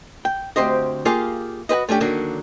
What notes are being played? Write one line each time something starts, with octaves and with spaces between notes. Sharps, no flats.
G5
D2 C4 G4 C5 D#5
A#3 F4 G4 G#4 F5
F#4 G4 B4 D#5
A3 C#4 D4 G4
D3 D#3 F#3 A#3 D4